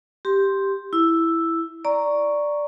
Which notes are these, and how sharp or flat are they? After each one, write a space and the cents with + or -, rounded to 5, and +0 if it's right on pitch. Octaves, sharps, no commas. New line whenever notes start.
G4 +0 C6 +0
E4 +0 E6 +0
D5 +0 A#5 +0 C#6 +0